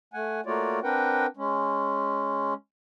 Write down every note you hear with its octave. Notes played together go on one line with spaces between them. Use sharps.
A3 F#5 G#5
A3 A#3 F4 F#4 C#5 D5
C4 D4 A#4 B4 F#5 G5
G#3 C#4